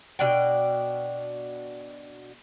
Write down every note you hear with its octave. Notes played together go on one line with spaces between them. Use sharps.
B2 G3 D4 G5